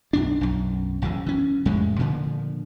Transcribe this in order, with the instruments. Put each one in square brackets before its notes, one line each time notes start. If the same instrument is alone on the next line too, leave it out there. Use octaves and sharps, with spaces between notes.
[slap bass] B1 F#2 D4
B1 F#2
A#1 F#2 C#3 E3
E3 C#4
F2 A2 G3 G#3
A#2 D3 F3